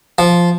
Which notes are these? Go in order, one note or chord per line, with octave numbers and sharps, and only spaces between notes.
F3